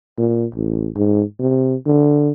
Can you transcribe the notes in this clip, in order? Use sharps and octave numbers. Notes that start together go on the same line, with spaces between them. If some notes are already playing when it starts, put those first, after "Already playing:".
A#2
A1
G#2
C3
D3